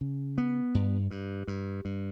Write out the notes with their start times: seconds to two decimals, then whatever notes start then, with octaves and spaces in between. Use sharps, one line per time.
0.01 C#3
0.38 B3
0.74 G2
1.11 G2
1.47 G2
1.85 G2